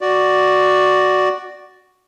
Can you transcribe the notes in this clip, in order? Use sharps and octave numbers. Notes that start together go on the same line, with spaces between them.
F#4 D5